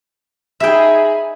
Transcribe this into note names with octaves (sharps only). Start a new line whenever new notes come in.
D#4 G#4 E5 G5 B5